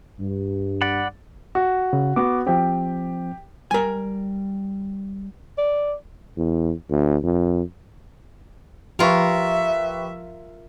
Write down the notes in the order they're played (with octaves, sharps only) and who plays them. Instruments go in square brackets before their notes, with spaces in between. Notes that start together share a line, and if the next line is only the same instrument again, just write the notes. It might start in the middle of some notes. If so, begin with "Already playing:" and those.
[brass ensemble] G2
[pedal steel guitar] D5 F#5 B5
[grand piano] F#4
[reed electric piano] C#3
[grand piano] B3 F#4 [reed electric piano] D6
[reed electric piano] F3 C4 [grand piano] G4 G5
[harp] G3 [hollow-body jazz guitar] A#4 G#5
[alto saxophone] D5
[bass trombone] E2
D2
F2
[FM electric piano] F3 [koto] F4 A#4 [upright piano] G4 B4 C#6 [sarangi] E5